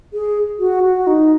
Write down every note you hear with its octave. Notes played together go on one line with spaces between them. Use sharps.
G#4
F#4
F#4
D#4